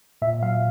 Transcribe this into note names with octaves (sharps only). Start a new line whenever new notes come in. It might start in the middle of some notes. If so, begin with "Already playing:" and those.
A#2 E5
F#3 F5